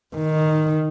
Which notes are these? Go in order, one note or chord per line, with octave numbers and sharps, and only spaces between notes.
D#3